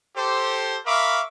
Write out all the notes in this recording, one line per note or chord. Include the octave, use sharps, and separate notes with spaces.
G4 A4 C5
A#4 E5 F5 B5 C#6 D6